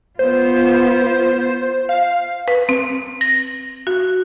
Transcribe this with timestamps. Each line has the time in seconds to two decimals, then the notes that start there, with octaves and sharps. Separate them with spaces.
0.19 B3 F4 C5
1.89 F5
2.48 B4
2.69 C4
3.21 A#6
3.87 F#4